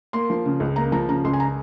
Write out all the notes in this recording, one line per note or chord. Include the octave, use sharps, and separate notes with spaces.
A#3 C6
F3
C#3
C#2
A#3 A#5
F3 A#5
C#3 A#5
C#2 C6
G#5
A#5